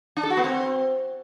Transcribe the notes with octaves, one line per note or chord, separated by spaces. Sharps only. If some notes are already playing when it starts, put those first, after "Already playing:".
D4
A4
F#4
B3
C4